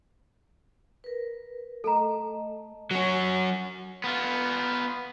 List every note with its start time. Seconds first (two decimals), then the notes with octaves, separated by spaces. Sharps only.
1.04 A#4 B4
1.84 A3 A4 D#5 A#5
2.91 F#3 C#4
4.04 B3 F4